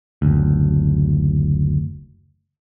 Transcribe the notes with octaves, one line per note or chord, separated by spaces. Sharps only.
F#1 D2